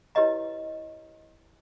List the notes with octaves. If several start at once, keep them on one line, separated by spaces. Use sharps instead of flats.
E4 G4 B4 C#5 D#5 A#5